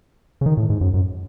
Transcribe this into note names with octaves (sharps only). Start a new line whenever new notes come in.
C#3
D#3
A2
G#2
F#2
F#2